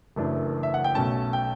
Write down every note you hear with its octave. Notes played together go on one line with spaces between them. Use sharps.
F#1 F#2 E3 A3 D4
E5
F#5
G5
B1 B2 A3 C#4 A5
G5